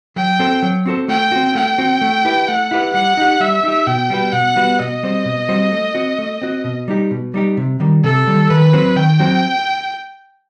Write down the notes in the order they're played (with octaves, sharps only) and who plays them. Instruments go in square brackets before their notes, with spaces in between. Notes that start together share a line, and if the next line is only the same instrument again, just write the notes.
[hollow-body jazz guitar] F#3 [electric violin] G5
[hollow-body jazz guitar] C4 F#4 A4 C5
F#3
C4 F#4 A4 C5
[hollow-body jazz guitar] A3 [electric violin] G5
[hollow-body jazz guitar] C4 F#4
[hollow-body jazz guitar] A3 [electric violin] G5
[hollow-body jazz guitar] C4 F#4
A3
E4 G4 B4
[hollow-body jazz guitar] A3 [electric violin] F#5
[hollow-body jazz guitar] E4 G4 B4
[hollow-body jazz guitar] G3 [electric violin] F#5
[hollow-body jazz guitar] D#4 G4
[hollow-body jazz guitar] G3 [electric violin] E5
[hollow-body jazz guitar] D#4 G4
[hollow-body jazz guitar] B2 [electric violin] G5
[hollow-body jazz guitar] G3 B3 F#4 B4
[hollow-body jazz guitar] B2 [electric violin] F#5
[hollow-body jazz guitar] G3 B3 F#4 B4
[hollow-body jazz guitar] B2 [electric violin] D#5
[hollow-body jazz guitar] G3 C4 F#4 C5
B2
G3 C4 F#4 C5
A3
C4 F#4
A3
C4 F#4
B2
G3 D#4 G4
B2
G3 D#4 G4
C3
D#3 G3
[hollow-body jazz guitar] C3 [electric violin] A4
[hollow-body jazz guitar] D#3 G3
[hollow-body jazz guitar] D#3 [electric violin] B4
[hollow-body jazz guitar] F#3 C4 F#4 C5
[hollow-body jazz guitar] D#3 [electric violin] G5
[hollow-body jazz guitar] F#3 C4 F#4 C5